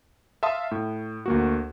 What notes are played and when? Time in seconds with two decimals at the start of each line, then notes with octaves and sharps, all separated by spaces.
0.43 E5 F5 A5 C6 D#6
0.71 A2
1.26 D2 A#3 F#4